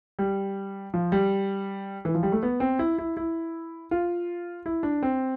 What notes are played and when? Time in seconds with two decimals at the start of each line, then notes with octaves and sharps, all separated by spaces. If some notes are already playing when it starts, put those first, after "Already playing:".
0.19 G3
0.94 F3
1.12 G3
2.05 E3
2.15 F3
2.23 G3
2.32 A3
2.43 B3
2.60 C4
2.79 E4
2.98 E4
3.17 E4
3.91 F4
4.66 E4
4.83 D4
5.03 C4